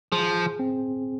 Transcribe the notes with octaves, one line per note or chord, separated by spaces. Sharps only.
F3 G#4
C4